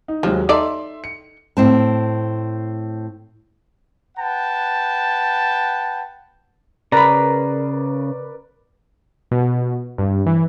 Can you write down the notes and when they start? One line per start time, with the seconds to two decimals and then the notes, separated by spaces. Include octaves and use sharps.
0.08 D#4
0.23 D#2 F3 F#3 G#3
0.49 D#4 A4 D5 E5 C6
1.04 C#7
1.57 A2 C4 A5
4.17 B4 F#5 G5 A5
6.92 C#3 A#4 B4 D5 A#5 B5
9.31 B2
9.98 G2
10.26 E3